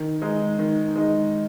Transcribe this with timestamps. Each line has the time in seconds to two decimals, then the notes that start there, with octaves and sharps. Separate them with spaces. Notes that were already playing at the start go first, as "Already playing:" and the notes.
Already playing: D#3
0.22 G#3 D#4
0.59 D#3
0.96 G#3 D#4